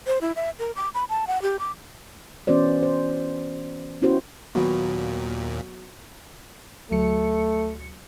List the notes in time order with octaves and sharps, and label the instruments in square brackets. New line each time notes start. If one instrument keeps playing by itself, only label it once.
[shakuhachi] C5
E4
E5
A#4
D6
B5
A5
F#5
G4
D6
[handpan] E3 B3 C#4 F#4 C5 D5
C5
B3 C#4 E4 F#4 G4 C5
[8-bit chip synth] D#2 A#2 [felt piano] F#3 B3 F#4
[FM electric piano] D2 F#3 C#7 [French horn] A3